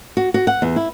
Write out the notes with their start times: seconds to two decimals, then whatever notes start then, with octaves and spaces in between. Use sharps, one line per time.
0.17 F#4
0.34 F#4
0.47 F#5
0.62 E2
0.76 E4